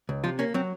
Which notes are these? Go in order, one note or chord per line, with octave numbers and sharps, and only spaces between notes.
C#2
C3 F3 F4
A#3 C#4
F#3 C4